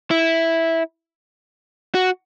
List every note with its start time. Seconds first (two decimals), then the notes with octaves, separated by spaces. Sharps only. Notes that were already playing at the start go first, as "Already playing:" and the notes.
0.11 E4
1.95 F#4